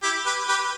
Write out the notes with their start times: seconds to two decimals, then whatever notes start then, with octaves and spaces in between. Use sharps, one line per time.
0.03 E4 G4
0.26 G4 B4
0.48 G4 B4